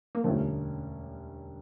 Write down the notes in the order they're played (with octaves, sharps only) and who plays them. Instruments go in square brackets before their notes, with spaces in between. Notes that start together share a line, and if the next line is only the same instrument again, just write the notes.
[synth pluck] A#3
[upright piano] E1 D2 D3 G3 C#4 [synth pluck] F3 A3